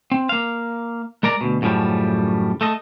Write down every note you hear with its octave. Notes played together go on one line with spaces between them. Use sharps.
C4
A#3 F5
G#3 A#4 D5 A#5
D2 B2
F#2 A2 C#3 F3 G3
A3 A4 D#5